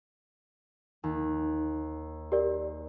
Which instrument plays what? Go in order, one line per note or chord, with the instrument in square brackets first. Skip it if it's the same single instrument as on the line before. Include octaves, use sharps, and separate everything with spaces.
[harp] D#2
[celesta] G4 A#4 D5